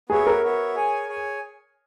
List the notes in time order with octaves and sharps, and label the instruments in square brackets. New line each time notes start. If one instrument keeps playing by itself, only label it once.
[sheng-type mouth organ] B3 F#4 C#5 E5 [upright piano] G#4
[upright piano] A#4
[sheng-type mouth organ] B3 F#4 C#5 E5
G#4 C#5 G#5
G#4 C#5 G#5